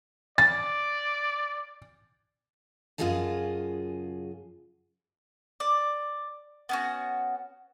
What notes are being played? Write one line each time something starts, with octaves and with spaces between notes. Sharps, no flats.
D5 A6
F#2 C#3 F4 G#4 D#5 A5
D5
B3 C#4 F#4